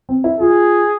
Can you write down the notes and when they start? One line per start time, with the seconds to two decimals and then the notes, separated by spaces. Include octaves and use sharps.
0.09 C4
0.24 E4
0.39 F4 G#4